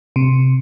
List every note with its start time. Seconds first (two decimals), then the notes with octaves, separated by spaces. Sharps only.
0.16 C3